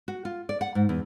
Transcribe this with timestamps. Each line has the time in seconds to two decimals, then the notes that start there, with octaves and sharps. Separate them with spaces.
0.08 F#4
0.25 F4
0.49 D5
0.61 F#5
0.75 G#2
0.89 E2